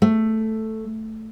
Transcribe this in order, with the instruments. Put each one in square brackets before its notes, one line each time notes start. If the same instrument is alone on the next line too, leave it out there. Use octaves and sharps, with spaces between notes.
[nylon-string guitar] A3